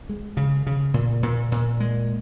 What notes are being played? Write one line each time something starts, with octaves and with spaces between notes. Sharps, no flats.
G#3
C#3
C#3
A#2
A#2
A#2
G#3